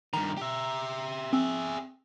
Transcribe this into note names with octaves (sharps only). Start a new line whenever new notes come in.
G2 D#3 A#5
G4 E5
C4 G#4 E5